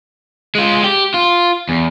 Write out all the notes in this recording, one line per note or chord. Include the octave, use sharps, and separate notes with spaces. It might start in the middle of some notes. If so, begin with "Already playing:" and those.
G#3 F4
G4
F4
E2